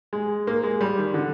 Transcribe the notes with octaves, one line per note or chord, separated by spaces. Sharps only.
G#3
A#3
G#3
G3
D#3
D3